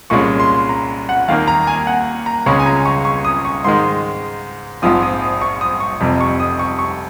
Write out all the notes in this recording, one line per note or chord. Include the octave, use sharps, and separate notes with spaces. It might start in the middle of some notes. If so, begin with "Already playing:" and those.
C2 A#2 G#3 C#4 C#6
C6
A#5
F#5
D#2 D#3 A#3 F5
A#5
G#5
F#5
A#5
C#2 C#3 G#3 C#4 C#6
G#5
A#5
C#6
C#6
D#6
C#6
G#2 D#3 G#3 C6
A#1 G#2 F3 C4 D#6
D#6
D#6
C#6
D#6
C#6
F1 F2 C3
C#6
D#6
C#6
C#6